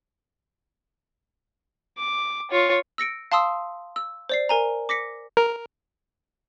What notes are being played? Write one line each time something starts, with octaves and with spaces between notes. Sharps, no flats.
D6
F4 C#5
E6 A#6 C#7 D7
F5 A5 C6 D#6 E6
E6
C5 D5 C7
A#4 G#5 A#5
D6 A#6 B6 C#7
A#4